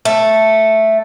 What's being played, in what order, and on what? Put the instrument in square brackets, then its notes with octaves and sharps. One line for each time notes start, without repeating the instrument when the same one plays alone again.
[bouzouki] A3